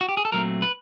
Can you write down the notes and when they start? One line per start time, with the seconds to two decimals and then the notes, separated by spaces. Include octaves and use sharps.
0.01 F#4
0.09 G4
0.17 G#4
0.25 A4
0.32 A#2 F#3 A3 C4 A#4
0.62 B4